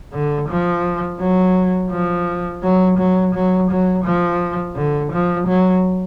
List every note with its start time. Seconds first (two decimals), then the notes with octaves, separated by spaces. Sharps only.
0.13 D3
0.49 F3
1.20 F#3
1.91 F3
2.63 F#3
2.98 F#3
3.34 F#3
3.70 F#3
4.05 F3
4.76 D3
5.12 F3
5.48 F#3